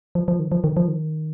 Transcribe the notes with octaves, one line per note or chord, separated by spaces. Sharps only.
F3
F3
D#3
F3
D#3
F3
D#3